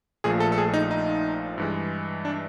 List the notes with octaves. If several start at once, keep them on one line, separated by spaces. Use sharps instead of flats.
A#1 A#2 F3 A3 G#4
A4
A4
G#4
D#4
D#4
G2 E3 G#3
D4